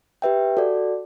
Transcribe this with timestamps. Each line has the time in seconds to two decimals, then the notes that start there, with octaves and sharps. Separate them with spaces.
0.22 G4 B4 E5 G5
0.57 F#4 A4 D5